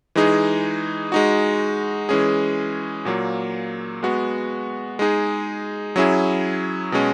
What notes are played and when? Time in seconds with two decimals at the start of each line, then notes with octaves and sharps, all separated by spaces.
0.15 E3 G#3 D#4 G#4
1.12 G#3 D#4 F#4
2.09 E3 G#3 C#4 G#4
3.05 A#2 F#3 A#3
4.03 G#3 B3 F#4
4.99 G#3 D#4 G#4
5.96 F#3 C#4 E4 G#4
6.92 B2 G#3 C#4